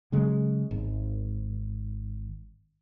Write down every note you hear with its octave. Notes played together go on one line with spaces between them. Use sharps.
C#3 F#3 G#3
G#1